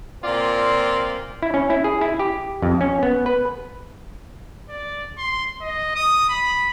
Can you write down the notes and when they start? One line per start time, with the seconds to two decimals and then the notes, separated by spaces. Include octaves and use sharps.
0.23 A#2 C4 F4 D5
1.43 E4
1.54 C#4
1.70 E4
1.84 G#4
2.01 E4
2.19 G4
2.62 F2
2.81 C#4
3.03 B3
3.26 B4
4.69 D5
5.18 C6
5.61 D#5
5.95 D#6
6.29 B5